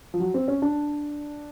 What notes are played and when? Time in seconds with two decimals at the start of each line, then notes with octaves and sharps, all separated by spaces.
0.14 F3
0.20 F#3
0.34 C4
0.48 C#4
0.62 D4